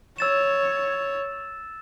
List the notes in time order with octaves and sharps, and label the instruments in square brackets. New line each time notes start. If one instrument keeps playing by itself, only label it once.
[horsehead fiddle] C#5 [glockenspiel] E6 A6 E7